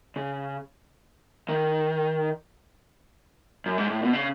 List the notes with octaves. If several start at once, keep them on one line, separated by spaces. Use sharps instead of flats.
C#3
D#3
F#2
G#2
A2
B2
C#3